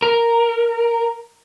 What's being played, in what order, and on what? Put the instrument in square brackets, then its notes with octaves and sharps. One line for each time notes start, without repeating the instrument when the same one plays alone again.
[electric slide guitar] A#4